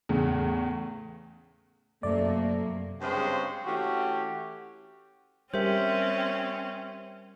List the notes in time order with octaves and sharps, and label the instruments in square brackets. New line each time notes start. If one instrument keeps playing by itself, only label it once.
[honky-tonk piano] E2 A2 C#3
[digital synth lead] F#2 [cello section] C3 F#3 A#3 [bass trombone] A3 [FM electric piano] D5
[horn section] G2 C#3 G#3 C4 C5 C#5
E3 A3 C#4 F#4 G4
[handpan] G3 G4 A#4 [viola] C4 C#4 [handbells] C5 E5